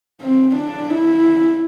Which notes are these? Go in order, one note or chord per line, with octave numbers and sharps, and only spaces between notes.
C4
D4
E4